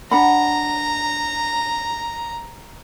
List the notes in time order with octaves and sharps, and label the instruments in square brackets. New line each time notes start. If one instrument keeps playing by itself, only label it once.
[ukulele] D4 F#5 B5 [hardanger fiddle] A#5